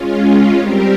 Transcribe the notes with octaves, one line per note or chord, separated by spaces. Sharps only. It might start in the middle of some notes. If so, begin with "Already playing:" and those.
Already playing: G#3 C#4 F4
G3 C4 G4 A#4